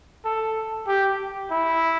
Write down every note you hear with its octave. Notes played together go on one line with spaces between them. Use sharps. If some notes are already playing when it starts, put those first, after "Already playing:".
A4
G4
E4